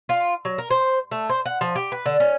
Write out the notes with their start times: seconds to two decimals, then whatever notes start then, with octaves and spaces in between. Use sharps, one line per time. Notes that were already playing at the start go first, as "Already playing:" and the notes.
0.09 F4
0.45 F#3
0.58 A#4
0.70 C5
1.11 A3
1.29 C5
1.46 F#5
1.61 F3
1.76 G4
1.92 B4
2.06 D3
2.20 C#4